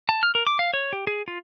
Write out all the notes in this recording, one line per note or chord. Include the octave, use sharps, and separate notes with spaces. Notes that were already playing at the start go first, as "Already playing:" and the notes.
A5
F6
A#4
D6
F5
C#5
G4
G#4
F4